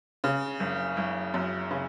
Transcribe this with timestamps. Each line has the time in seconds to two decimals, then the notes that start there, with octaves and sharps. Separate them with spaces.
0.24 C#3
0.60 F#1
0.97 F#1
1.34 F#2
1.71 C#3